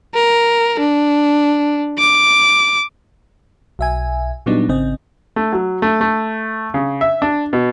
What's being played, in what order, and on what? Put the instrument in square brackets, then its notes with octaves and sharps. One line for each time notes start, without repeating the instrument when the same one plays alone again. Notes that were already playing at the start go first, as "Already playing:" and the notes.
[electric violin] A#4
D4
D6
[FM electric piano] B1 E5 G#5
A#2 F#3 G3 B3 D4 D#4
G#1 C#3 C4 D#5
[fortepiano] A3
F#3
A3
A3
C#3
E5
D4
B2